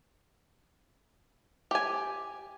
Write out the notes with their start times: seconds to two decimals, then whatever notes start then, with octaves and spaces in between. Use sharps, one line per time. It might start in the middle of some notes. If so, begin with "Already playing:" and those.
1.71 G4 G#5